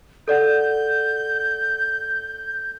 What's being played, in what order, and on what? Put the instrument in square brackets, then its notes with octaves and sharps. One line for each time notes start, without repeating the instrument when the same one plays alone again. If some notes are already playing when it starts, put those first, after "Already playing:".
[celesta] A4 D5 F#5 [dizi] G6